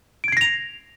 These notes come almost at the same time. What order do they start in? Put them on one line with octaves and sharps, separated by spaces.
D7 G#6 C7 A#6 F7